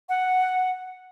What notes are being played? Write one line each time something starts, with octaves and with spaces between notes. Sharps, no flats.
F#5